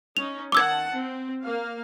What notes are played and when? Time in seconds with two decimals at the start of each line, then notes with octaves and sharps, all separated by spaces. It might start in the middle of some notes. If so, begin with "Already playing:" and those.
0.17 C#4 D#4 F7
0.52 D#3 F#5 A5 D6 E6 G#6
0.92 C4
1.43 A#3 A#4 F5